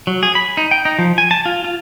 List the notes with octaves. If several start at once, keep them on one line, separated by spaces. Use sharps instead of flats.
F#3
G#4
B5
D#4
G5
D#4
F3
G#5
A5
F4
F4